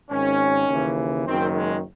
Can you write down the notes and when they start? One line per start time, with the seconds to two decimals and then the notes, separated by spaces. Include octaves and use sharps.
0.10 G#1 G#2 D#3 C#4
0.68 D#2 C#3 E3
1.26 F#1 F#2 D#3 C4
1.56 G#3